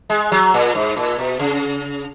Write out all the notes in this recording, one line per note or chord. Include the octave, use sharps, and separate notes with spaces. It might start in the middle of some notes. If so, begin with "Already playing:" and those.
G#3
F#3
A#2
G#2
A#2
B2
C#3